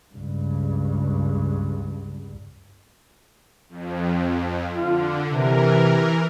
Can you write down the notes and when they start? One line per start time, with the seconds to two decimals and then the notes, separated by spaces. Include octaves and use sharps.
0.15 C#2 G2
3.69 F2
4.78 D3 F4
5.30 C3 E3 A#4